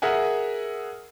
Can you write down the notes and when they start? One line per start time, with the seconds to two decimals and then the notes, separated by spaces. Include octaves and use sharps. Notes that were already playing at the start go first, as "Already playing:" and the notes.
0.02 G#4 A#4 E5 F#5 G#5